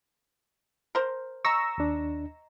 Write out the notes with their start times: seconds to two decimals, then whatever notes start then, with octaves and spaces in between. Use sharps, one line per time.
0.95 A#4 C5
1.45 D#5 A#5 C#6 E6 A#6
1.78 D#2 D4